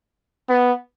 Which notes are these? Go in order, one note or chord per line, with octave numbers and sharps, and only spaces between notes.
B3